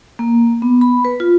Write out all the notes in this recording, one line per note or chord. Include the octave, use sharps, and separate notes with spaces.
A#3
B3
B5
B4
F4